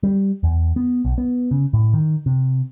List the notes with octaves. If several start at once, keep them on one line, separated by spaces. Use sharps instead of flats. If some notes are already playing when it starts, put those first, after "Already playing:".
G3
E2
B3
B1
B3
C#3
A2
D#3
C3